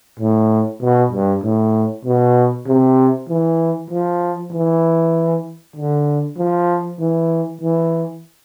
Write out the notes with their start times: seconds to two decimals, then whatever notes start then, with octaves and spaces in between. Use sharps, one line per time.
0.20 A2
0.81 B2
1.12 G2
1.43 A2
2.05 B2
2.67 C3
3.29 E3
3.90 F3
4.52 E3
5.76 D3
6.37 F3
6.99 E3
7.61 E3